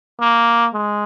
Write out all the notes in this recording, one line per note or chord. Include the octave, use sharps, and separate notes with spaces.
A#3
G#3